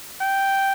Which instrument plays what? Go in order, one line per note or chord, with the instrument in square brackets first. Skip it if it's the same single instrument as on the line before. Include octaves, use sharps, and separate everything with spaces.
[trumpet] G5